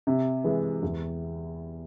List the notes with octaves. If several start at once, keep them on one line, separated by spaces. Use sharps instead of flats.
C3
E3 G#3
E2